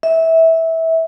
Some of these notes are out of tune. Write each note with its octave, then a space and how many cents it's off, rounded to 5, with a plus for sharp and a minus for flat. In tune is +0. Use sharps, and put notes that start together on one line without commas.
E5 -20